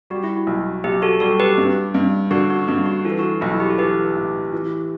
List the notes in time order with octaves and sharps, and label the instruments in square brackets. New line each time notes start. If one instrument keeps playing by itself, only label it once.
[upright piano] G3 [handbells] F#4
[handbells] E4
F#4
[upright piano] B1
[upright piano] B1 [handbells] G4
[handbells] F#4 A4
[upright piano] G3 [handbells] F#4 A4
[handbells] G4 B4
[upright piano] G2
G2
[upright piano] D3 [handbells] F#4
[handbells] F#4
[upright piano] G2 [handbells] F#4
[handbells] F#4
[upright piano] E3 [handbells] A4
[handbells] B4
F#4 A4
[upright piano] B1 [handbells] E4
[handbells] F#4
G4
A4
[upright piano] E3 [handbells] G4 B4
[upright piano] A2
E3